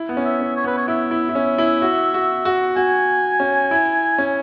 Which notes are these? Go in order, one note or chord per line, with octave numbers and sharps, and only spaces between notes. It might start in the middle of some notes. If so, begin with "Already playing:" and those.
Already playing: E4
B3
C#4
E5
C#4
C#5
B3 B4
C#5
E4 E5
E4
E4
C#4
E4
F#4
F#4
F#4
F#4 G#5
C#4
E4
C#4